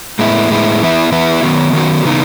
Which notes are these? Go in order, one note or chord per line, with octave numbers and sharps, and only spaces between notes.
A2 G#3 B3 E4
A2 G#3 B3 E4
E3 B3 E4
E3 B3 E4
D#3 F#3 B3 F#4
D#3 F#3 B3 F#4
C#3 E3 B3 D#4